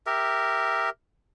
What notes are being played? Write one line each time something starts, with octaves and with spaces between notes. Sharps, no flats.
G4 A#4 E5